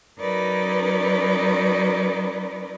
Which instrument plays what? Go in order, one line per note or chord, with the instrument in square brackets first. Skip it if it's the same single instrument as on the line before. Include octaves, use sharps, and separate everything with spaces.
[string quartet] F#3 C#4 D#4 A#4 B4 D5